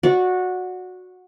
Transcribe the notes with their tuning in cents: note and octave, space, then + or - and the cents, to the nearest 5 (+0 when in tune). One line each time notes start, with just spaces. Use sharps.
F#4 -15 D5 -10